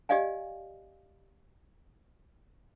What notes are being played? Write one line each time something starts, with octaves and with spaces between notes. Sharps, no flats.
G4 D5 D#5 F5 G#5